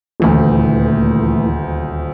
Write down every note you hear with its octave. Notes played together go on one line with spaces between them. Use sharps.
D#1 D2 A#2 E3 A3